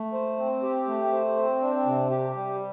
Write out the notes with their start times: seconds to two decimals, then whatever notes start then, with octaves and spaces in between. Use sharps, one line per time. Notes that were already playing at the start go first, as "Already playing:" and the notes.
Already playing: A3
0.13 C5
0.38 C4
0.63 G4
0.87 A3
1.12 C5
1.37 C4
1.61 D4
1.86 C3
2.10 G4
2.34 G3